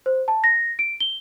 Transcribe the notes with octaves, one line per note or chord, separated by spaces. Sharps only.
C5
A5
A#6
D7
G7